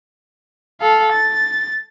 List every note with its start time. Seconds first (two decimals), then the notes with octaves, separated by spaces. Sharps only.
0.81 A4 F5
1.12 A6